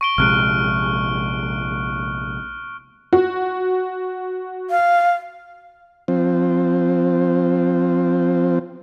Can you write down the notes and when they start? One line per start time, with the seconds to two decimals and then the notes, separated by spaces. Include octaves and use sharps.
0.01 C#6 D7 G7
0.18 A#1 C3 G#3 F6 F#6 D7
3.13 F#4
4.70 F5
6.08 F3 C4